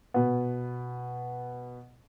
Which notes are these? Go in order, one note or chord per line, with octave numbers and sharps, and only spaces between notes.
B2 B3